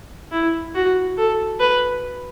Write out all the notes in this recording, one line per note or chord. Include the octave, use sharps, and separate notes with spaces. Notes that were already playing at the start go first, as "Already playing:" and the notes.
E4
F#4
A4
B4